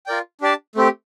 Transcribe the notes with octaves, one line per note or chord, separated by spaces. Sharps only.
F4 A#4 D5 G5
D4 G4 D5 A5
A3 C4 G4